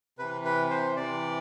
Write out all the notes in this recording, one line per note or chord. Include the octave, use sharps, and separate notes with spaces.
C3 E3 B4
B4
C5
C3 E3 D5